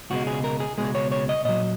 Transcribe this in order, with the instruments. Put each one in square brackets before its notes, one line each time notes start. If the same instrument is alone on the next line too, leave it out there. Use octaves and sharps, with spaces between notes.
[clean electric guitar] C#2 B2 G#3 F#4
G#4
A#4
G#4
C#2 B2 G#3 G#4
C#5
C#5
D#5
A#2 F#3 D#5